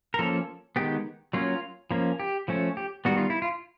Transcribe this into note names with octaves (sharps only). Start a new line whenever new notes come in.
A#4
F3 A#3 C#4 A4
D#3 G#3 B3 G4
F#3 A#3 C#4 F4
F3 A#3 C#4
G4
F3 A3 C#4
G4
D#3 G3 B3 F#4
F4
E4
F4